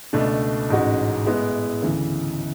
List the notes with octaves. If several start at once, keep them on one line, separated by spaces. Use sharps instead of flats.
C#2 B2 A3 D4
A1 G#2 G#3 C#4 F#4
A2 G#3 B3 E4
D2 C#3 E3